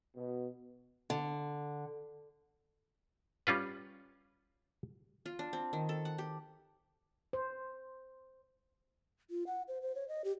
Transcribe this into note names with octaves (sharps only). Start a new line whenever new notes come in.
B2
D3
G3 C#4 F4 B4
F4
D4
C4
D#3
A4
F#5
G4
C5
F4
F#5
C5
C5
C#5
D#5
G4